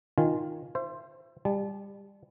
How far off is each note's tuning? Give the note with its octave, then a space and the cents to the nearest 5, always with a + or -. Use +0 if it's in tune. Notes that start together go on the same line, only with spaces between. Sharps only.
D#3 +0 F4 +0 G#5 +0
C5 +5 E5 +40
G3 +25 A5 -30